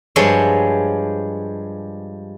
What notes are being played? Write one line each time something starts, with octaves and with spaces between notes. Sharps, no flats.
G2 F3 G#3 C#5 E5